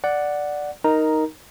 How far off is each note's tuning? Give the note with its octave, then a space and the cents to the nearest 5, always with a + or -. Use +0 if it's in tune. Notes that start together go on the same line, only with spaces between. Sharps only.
D5 +0 F#5 +0
D#4 +5 A#4 +0 A#5 +0